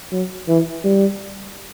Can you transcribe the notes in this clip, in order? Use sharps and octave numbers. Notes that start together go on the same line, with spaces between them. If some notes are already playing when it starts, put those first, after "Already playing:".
F#3
E3
G3